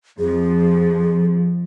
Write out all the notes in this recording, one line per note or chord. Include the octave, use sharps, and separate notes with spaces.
F2 F3 G#4